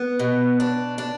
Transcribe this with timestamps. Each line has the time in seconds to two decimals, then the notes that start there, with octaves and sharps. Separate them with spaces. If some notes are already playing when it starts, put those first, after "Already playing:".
Already playing: B3
0.19 B2
0.60 D4
0.98 D4